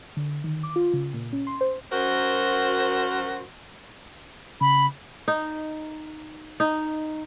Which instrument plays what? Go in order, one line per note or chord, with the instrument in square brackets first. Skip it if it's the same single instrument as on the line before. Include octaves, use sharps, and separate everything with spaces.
[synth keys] D3
D#3
D6
F4
C#3
A#2
C#4
C6
C5
[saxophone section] F#2 F#4 A#4 C5
[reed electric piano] C#3 [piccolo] B5
[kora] D#4
D#4